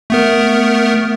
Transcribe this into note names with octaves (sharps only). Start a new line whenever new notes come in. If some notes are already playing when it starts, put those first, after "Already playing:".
A3 B3 A#4